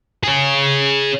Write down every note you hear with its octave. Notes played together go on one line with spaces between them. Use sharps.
G#4 C#5